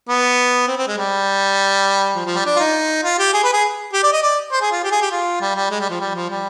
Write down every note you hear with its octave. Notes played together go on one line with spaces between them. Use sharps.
B3
C4
C4
G#3
G3
F3
F3
G3
D4
F4
D#4
F4
G4
G#4
B4
G#4
G4
D5
D#5
D5
C5
G#4
F4
G4
G#4
G4
F4
G3
G3
G#3
G3
F3
G3
F3
G3